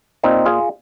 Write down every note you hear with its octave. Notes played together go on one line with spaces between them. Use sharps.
A#2 C4 D#4
F4 G#4